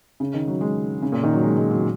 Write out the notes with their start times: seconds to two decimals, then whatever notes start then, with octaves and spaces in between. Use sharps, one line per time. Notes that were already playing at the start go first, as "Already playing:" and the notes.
0.20 C#3
0.34 D#3
0.48 F#3
0.61 G#3
1.02 C#3
1.12 A#2
1.23 D#3
1.33 F#3
1.43 G#3
1.57 G#3
1.71 F#3